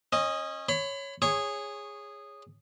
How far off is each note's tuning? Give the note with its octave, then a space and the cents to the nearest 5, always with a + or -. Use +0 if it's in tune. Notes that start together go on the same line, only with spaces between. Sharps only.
C#4 -30 D#5 +0
C#5 +0 B5 +35
G#4 -10 C#5 +0 C#6 -15